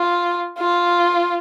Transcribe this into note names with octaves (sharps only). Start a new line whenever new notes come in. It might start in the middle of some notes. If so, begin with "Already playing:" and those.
Already playing: F4
F4